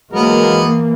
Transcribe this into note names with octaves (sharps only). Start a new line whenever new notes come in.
E3 F#3 G#3 A#3 B3 A#4